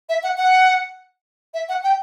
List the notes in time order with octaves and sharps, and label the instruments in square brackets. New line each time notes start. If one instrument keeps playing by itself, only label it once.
[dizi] E5
F#5
F#5
E5
F#5
G5